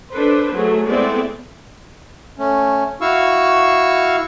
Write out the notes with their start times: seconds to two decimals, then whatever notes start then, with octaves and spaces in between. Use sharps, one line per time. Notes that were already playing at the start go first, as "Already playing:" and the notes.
0.11 D4 A4 B4 C5
0.53 F#3 A3 G#4
0.86 G#3 A3 B3 C4 E4 D5
2.38 A3 C#4
3.01 E4 F#4 F5 C#6 E6